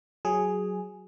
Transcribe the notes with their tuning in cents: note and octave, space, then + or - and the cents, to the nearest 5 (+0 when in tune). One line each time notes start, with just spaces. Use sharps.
F#3 +5 G#4 +0